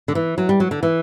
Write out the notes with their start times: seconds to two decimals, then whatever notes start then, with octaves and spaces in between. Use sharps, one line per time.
0.08 D3
0.15 E3
0.38 F#3
0.49 G3
0.60 F#3
0.71 D3
0.83 E3